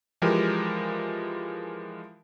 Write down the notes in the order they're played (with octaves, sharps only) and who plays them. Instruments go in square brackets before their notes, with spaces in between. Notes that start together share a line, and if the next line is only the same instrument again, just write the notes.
[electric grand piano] E3 F3 G#3 G4 A#4